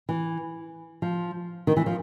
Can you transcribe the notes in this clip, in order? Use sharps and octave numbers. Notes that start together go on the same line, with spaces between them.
E3
F3
D#3
E3
F3